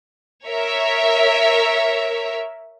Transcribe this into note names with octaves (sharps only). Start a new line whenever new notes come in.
A#4 C#5 E5